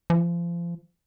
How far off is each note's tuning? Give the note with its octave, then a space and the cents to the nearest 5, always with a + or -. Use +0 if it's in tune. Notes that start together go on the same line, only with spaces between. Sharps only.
F3 -30